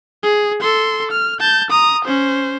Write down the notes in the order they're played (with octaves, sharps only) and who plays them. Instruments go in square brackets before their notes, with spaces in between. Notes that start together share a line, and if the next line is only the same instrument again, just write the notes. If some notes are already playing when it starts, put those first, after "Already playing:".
[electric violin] G#4
A4 C6
F6
A5 G6
A#5 D#6
C#4 C5